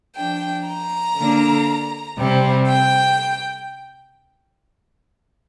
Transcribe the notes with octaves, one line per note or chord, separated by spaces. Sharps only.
F3 D4 G5
A#5
D3 A#3 D4
C3 G3 C4
G5